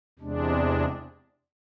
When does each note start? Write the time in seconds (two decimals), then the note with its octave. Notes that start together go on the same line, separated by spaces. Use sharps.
0.19 E2 C3 G#3 D4